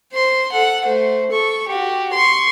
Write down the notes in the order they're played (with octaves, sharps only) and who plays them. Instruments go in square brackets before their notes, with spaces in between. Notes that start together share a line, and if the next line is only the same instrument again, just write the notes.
[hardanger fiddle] C5 C6
A4 F#5
A3 C5
A4 C#6
F#4 G4
C6 C#6